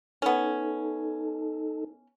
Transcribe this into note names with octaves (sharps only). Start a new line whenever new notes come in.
B3 C#4 D#4 A4